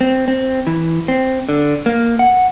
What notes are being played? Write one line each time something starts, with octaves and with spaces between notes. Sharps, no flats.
C4
C4
E3
C4
D3
A#3
F#5